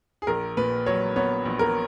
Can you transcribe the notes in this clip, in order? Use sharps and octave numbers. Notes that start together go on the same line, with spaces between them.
G#4
A#1 A#4
A#2 B4
F#3 C#5
B3 C#5
A#1
A#4